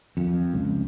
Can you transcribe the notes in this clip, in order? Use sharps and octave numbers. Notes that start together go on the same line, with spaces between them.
F2
C#2